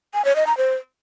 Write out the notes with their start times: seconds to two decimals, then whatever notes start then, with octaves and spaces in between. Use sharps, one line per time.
0.14 G#5
0.25 C#5
0.36 D#5
0.47 A#5
0.58 C5